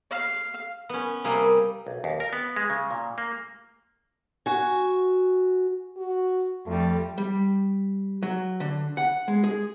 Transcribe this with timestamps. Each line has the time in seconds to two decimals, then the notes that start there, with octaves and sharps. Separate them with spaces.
0.10 F5
0.89 B3 C#4
1.24 C3 G3 A#3 G#4 G5
1.87 B1
2.04 D#2
2.20 A#4
2.33 B3
2.56 G#3
2.70 C#3
2.91 A#2
3.18 A#3
4.46 F#4 G#5
5.97 F#4
6.66 F2 G3 A3
7.18 G3
8.22 F#3
8.60 D3
8.97 F#5
9.28 G#3
9.44 G#4